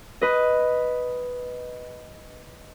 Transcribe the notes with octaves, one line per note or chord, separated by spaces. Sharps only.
B4 D#5